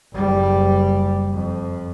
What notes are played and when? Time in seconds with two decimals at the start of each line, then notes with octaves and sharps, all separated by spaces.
0.13 F#1 G3
1.33 F2